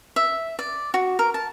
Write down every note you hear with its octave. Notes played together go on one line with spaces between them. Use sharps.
E5
D5
F#4
A#4
A5